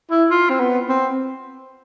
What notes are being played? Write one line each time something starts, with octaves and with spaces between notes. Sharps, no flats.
E4
F4
C4
B3
C4